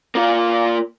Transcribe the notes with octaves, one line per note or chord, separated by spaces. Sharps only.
A#3 F4